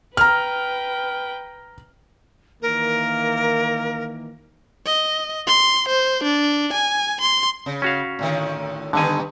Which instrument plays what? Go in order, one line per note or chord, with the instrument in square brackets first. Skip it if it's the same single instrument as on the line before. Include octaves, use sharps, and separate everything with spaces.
[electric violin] B4 G5 [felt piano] A#5 F6
[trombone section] D#3 E3 A#3 [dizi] A#4
[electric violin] D#5
C6
C5
D4
G#5
C6
[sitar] C#3
[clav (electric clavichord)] C#4 F#4 F5
[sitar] A2 D3 D#3
[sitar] G2 D#3 B3 [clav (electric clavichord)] D3 G#5